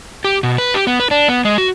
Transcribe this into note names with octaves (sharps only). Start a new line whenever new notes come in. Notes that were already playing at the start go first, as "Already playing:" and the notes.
G4
B2
B4
G4
B3
B4
D4
B3
G#3
F#4